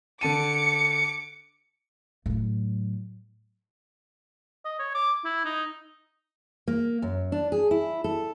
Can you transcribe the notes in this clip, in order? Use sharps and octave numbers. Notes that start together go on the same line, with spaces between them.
D3 A5 D6 C#7 D#7
A2 F#3
D#5
C#5
D6
E4
D#4
A#3
F#2
D4
G#4
E4
A4